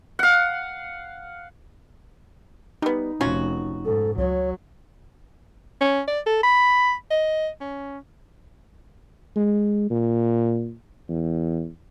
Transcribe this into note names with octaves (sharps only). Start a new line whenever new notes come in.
F5 F#5
G3 B3 D#4
F1 C#4 F4 F#4
G#2 A4
C#2 F#3 C#5
C#4
D5
A4
B5
D#5
C#4
G#3
A#2
E2